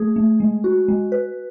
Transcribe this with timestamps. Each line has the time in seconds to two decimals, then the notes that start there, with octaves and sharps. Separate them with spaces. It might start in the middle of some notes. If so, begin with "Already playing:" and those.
Already playing: A3 G#4
0.16 A3
0.40 G#3
0.64 F#4
0.88 G#3
1.12 B4